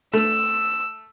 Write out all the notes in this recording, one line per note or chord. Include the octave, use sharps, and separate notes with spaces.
A3 E6